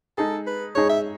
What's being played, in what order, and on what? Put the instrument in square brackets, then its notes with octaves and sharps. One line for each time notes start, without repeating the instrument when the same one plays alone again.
[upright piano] G#3 D#4 G#4 [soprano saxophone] A4
[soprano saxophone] B4
[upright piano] G#3 D#4 G#4 [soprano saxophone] C#5
[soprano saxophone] E5